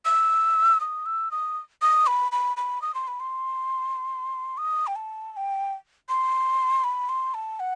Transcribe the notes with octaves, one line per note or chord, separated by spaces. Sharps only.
E6
D#6
E6
D#6
D#6
B5
B5
B5
D#6
C6
B5
C6
D#6
G5
A5
A5
G5
C6
B5
C6
A5
F#5